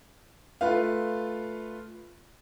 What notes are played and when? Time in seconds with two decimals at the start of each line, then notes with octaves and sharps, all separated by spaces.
0.61 A3 F4 B4 F5